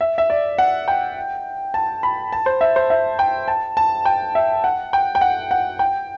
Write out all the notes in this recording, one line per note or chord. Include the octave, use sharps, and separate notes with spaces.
E5
E5
D5
F#5
G5
A5
B5
A5
C5
E5
C5
E5
G5
A5
A5
G5
E5
F#5
G5
G5
F#5
F#5
G5